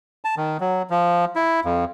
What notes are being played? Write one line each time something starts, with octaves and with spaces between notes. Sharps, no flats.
A5
D#3
F#3
F3
E4
F2